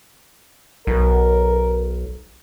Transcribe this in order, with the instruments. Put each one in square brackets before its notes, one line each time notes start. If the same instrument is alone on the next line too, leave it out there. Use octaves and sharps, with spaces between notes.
[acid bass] B1 [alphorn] A#4